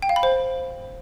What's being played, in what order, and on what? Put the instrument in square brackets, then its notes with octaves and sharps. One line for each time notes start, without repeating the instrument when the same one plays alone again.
[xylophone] G5
F5
B5
C5